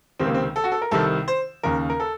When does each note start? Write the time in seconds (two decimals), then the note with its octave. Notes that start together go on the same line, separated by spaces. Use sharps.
0.19 C#2 C3 D#3 C4
0.27 A#3
0.34 C4
0.56 A4
0.64 F#4
0.72 A4
0.82 A#4
0.91 C2 C3 D#3 A4
1.28 C5
1.63 D#2 C#3 A#4
1.90 A#4
2.00 A4